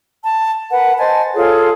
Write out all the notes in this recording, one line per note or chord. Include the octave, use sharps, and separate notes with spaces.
A5
A#4 B4 F#5
C5 D#5 G#5 A5
F4 G#4 A4 C#5